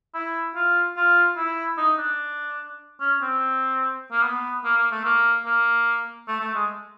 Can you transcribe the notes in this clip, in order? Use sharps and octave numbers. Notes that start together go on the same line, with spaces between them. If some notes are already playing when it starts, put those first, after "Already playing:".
E4
F4
F4
E4
D#4
D4
C#4
C4
A#3
B3
A#3
A#3
A3
A#3
A#3
A3
A3
G#3